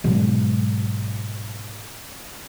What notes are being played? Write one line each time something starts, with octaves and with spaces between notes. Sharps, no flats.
G#2 B2 F#3 G#3